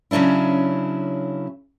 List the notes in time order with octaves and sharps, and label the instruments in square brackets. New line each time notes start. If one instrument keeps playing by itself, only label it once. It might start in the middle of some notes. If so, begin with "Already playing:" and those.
[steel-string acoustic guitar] C#3 F#3 C#4 D4 E4